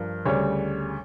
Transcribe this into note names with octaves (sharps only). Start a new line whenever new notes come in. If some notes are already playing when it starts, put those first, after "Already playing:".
Already playing: G2 F3 A#4
D2 C#3 G3 C#5